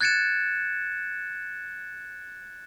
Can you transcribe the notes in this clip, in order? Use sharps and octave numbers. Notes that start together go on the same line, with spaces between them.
F#6 G#6 A6 C#7 D7 E7